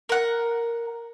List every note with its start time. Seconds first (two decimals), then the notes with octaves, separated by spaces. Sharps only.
0.09 A#4 F#5